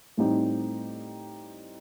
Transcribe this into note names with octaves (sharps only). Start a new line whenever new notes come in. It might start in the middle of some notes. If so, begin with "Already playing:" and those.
A2 G3 C4 D#4 G4